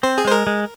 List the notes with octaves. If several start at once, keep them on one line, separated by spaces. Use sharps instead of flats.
C4 C5
G#4
G#3 C5
A#4
G#3